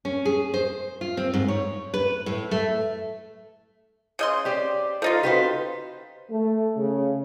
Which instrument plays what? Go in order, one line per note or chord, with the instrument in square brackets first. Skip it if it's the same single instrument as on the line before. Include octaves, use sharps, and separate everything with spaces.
[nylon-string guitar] C#4
G#4
C5
F4
C4
G#2
C#5
B4
A2
A3
[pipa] C#3 D#5 C6 [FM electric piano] G6
[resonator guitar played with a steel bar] G4 C5 D5
[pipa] F3 D#4 F4 [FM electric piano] A4 D#5 A6
[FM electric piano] F#4 D#5 F5 [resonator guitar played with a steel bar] G4 B4 C5
[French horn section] A3
C#3